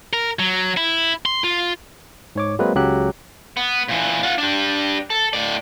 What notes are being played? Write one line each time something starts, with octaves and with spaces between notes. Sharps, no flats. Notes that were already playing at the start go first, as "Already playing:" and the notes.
A#4
F#3
E4
C6
F4
G#2 C#5 D6
F#3 G#3 A#3 C4 B4
C#2 C#3 F#3 G4 F#6
B3
A#2 E3
F4 F#5
D4 G4
A4
A2 D5